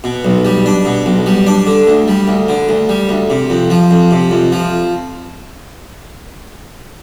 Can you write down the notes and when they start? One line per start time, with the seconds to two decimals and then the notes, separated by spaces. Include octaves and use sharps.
0.04 B2
0.25 B1
0.45 G3
0.66 D4
0.85 B2
1.06 B1
1.26 G3
1.47 D4
1.67 D3
1.87 D2
2.08 G3
2.28 D2
2.49 D3
2.69 D2
2.89 G3
3.09 D2
3.30 C3
3.50 F2
3.70 F3
3.91 F2
4.11 C3
4.31 F2
4.52 F3